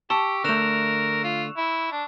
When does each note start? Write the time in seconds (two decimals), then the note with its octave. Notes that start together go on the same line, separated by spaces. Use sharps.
0.10 G4 A5 C#6 E6 C#7
0.44 D3 A3 A#4 F#6 E7 F7
1.24 F4
1.57 E4
1.92 D4